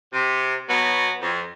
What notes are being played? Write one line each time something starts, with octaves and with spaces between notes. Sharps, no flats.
C3
B2 F#3 B3
F2